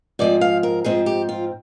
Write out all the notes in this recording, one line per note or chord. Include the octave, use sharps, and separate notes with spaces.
G#2 F3 C4 D5
F5
A#4
G#2 F3 C4 G#4
G4
F4